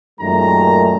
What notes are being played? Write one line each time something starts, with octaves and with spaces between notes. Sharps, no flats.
F#2 A#2 D#3 G#3 A3 A#5